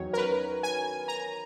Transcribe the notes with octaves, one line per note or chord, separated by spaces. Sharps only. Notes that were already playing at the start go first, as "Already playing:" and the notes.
Already playing: E2 D#3 F#3 C#4 C#5
A#4
B4
G#5
A#5